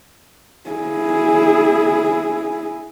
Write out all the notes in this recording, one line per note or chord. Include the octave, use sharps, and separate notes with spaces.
E4 G#4